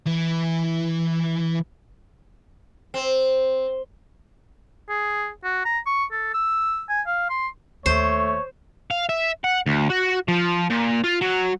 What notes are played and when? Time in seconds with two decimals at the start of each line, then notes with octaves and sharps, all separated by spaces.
0.07 E3 E4
2.94 C4
4.89 G#4
5.44 F#4
5.65 A#5
5.86 C#6
6.12 A4
6.34 E6
6.89 G#5
7.06 F5
7.30 C6
7.86 D#2 A3 C5 C#5
8.91 F5
9.09 E5
9.44 F#5
9.66 D2
9.90 F#4
10.28 F3
10.70 A#2
11.04 F4
11.21 F#3